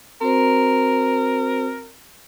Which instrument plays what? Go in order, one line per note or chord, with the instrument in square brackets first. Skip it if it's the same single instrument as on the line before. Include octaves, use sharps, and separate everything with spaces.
[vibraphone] C4 F#4 C5 [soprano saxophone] A#4